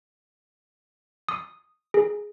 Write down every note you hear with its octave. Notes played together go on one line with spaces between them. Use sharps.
D#6
G#4